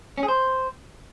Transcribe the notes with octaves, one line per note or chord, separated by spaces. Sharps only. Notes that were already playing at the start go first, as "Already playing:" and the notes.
C#4
G#4
C5